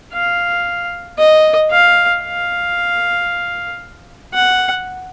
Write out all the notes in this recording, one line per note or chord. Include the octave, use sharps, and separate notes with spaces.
F5
D#5
F5
F5
F#5